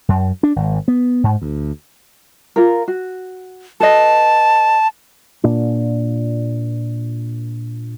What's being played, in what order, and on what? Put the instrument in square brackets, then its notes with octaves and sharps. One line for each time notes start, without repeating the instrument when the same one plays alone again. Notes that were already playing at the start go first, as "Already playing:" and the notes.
[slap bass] F#2
D4
G#1
B3
G#2
D2
[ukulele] F4 A#4
F#4
[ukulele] A4 B4 D#5 [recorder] A5
[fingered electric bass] A#2 D4